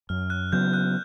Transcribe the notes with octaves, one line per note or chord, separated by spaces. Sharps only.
F#2 F6
F#6
C#3 F#3 B3 G6
F#6